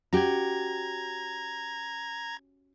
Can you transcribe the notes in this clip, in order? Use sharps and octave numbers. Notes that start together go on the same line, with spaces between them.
C#4 F#4 G4 A#5 G#6